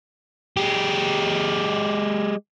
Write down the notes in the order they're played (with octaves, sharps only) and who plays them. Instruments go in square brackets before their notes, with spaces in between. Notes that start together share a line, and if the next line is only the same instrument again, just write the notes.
[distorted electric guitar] G#3 G4